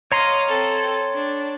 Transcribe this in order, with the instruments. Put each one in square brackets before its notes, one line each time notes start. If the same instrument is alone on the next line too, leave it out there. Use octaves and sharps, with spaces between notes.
[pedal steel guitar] C#5 A#5 C6 [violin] D#5 F5
[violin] C4 A4
D4